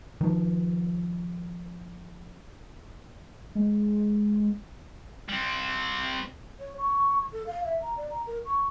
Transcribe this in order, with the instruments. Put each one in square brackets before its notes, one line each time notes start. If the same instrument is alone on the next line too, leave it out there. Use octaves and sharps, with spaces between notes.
[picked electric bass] D#3 F3
[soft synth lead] G#3
[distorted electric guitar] G3 C4
[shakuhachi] C#5
C#6
A4
F5
E5
A#5
D5
A#5
A#4
C#6